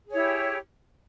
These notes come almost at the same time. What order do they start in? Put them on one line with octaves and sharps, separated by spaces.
G#4 C#5 E4 G4